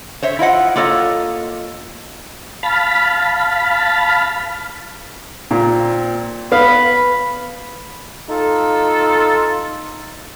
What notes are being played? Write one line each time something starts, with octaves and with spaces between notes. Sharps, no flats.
C5 C#5 E5
E4 F4 D#5 F#5
A#3 F4 A4 C#5 D#5
F5 A5 B5
A#2 C4
B3 F5 B5
D#4 F4 A4